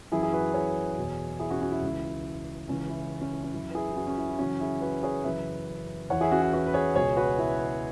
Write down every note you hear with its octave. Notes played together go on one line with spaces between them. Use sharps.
F#2 E3 E4 G#4
G#4
F#4 B4
G#4 C#5
E2 B2
E4 G#4
C#4 F#4
C#4 F#4
E4
C#2 C#3 E3
C#2 C#3 E3 C#4
E4
C#4
E4
C#4
F#2 E3 E4
B4
E4 G#4
E4
C#4 F#4
C#4
E4
E4
F#2 C#3 E3 C#4 F#4
E4 G#4
F#4 B4
G#4 C#5
F#2 C#3 E3 B4 E5
E2 E3 C#5 F#5
E4 G#4
C#4 F#4
E4 G#4
F#4 B4
B4
G#4 C#5
C#2 B2 G#4 C#5
F#4 B4
E4